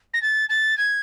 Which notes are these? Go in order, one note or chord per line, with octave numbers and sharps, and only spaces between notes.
A#6
A6
A6
G#6